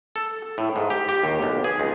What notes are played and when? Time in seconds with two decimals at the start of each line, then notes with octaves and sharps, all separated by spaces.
0.16 A4
0.58 A2
0.76 G#2
0.90 G4
1.09 G4
1.24 D#2
1.42 B1
1.64 G#4
1.79 C#2